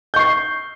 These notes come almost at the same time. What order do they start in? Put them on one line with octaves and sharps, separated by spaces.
G6 C#6 C7